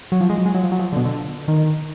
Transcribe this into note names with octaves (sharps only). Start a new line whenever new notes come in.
F#3
F3
G#3
F#3
G#3
F#3
F3
F#3
F3
D3
B2
D3
D#3